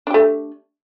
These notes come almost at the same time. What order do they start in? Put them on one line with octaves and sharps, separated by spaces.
D4 G4 A3